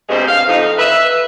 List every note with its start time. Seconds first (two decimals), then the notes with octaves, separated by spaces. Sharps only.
0.09 D2 G2 B2 G#3 C4 C5
0.28 F5
0.47 F2 D#4
0.77 B4 E5